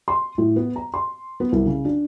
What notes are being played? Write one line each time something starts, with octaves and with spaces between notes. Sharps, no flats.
C6
A2
B3
A#5
C6
B3
C2
C#3
D4